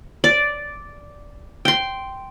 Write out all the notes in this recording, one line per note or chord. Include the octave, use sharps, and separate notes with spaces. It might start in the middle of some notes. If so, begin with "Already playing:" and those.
D5
G5 C6